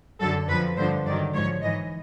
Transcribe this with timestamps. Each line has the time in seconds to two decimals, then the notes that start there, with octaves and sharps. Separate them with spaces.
0.20 F#2 D3 F#3 A4
0.48 F2 D3 F3 B4
0.77 G2 D3 F3 C5
1.05 G2 D#3 F#3 D5
1.34 G#2 F3 C#5
1.63 G#2 E3 D#5